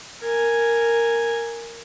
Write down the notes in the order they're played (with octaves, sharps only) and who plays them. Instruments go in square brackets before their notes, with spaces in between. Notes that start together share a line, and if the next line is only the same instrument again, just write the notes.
[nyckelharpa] A#4 G#5